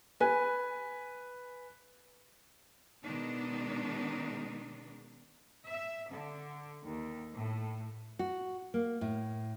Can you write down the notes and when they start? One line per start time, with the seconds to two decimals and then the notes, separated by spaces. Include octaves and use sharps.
0.20 B4 G#5
3.03 B2 D#3 G#3 B3 D4 D#4
5.67 E5
6.12 D3
6.84 D#2
7.36 A2
8.19 F#4
8.74 A#3
9.01 A2